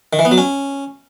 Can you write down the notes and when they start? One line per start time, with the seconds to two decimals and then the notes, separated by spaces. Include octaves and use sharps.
0.13 D#3
0.19 E3
0.25 B3
0.32 F#3
0.38 C#4